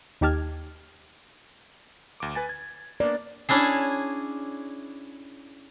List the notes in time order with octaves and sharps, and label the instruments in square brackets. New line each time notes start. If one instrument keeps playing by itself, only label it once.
[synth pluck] D#2 D#4 G4 A5 F6 G#6
[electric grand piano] D2 D6
B4 G#5 A6
G#6
[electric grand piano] A#3 B3 D4 [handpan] D5
[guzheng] C#4 D4 E4 G#4